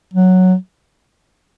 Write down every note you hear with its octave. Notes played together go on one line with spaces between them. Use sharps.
F#3